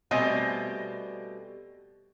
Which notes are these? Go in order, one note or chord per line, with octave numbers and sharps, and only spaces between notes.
B2 G3 A3 C4 D#5 G#5